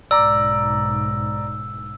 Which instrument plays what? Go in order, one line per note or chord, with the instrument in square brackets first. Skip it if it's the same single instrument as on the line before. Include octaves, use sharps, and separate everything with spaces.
[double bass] B1 G#2 [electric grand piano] D5 A#5 D6 [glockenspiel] E6